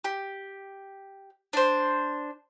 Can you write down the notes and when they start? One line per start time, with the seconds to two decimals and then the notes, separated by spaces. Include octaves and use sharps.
0.04 G4
1.53 D4 C5